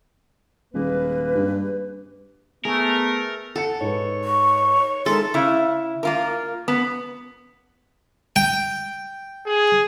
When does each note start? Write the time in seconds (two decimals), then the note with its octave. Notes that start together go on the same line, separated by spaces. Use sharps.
0.74 D#1 G#3 A#3 B4
1.35 G2
2.65 A3 B3 G#4 A#4
3.56 A4 F#5 C#7
3.81 G#2 B4 C#5
4.25 C#6
5.06 G#3 D#4 A4 A#4 E5 C6
5.34 C#3 E4
6.03 A#3 F4 A#4
6.68 B3
8.36 G5
9.47 G#4